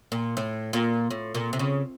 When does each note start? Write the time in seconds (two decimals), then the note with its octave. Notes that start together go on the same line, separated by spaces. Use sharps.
0.12 A#2
0.37 A2
0.73 A#2
1.11 A2
1.35 A#2
1.53 C3
1.59 C#3